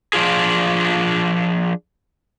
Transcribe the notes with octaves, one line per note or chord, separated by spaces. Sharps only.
F3 D4 F4 G#4